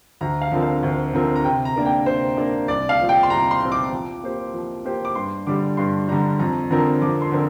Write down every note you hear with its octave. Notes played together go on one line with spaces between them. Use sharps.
D2 A#5
F5
D3 F3 C4 A#4
F5
D2
D3 F3 C4 A#4
A#5
C3 G5
A#5
A#3 D4 A#4
G5
C3 C5
A#3 D4 A#4
C2 D5
F5
A#2 F3 C4
G5
C6
C2 A#5
C6
A#2 F3 C4
D6
F3
A#3 G4 C5
F3
A#3 G4 C5
D6
G2 C6
D3 G3 D6
G2 C6
D3 G3 A#5
F2 A#5
D3 F3 C4 A#4 A#5
F2 D6
C6
D3 F3 C4 A#4